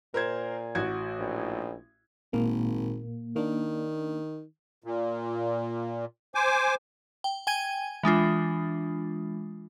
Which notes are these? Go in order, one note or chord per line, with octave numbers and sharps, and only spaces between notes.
A#2 A#4 C5 G#6
A1 F#4 G#6
A#1
G#1 A#2 A#3
D#3 A#3 D4
A#2
C5 G#5 D6
G5
G5 G#5 G#6 D#7
E3 G#3 D4 F4